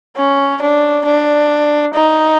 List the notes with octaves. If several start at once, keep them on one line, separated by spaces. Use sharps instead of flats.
C#4
D4
D4
D#4